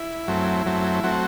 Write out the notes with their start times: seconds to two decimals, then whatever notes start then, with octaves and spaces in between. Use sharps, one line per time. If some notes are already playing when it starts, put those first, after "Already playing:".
Already playing: E4
0.27 F#2 F#3 A3 C4
0.66 F#2 F#3 A3 C4
1.04 F#3 A3 C4 F#4